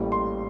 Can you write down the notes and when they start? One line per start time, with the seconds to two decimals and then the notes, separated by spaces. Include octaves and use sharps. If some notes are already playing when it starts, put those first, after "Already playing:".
Already playing: A1 A2 G3 A#3
0.12 C6